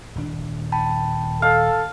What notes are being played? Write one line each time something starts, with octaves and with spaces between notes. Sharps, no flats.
D#1 D4
G5 A5 B5
A4 F5